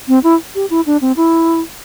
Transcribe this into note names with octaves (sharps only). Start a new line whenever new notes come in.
C4
E4
G4
E4
D4
C4
E4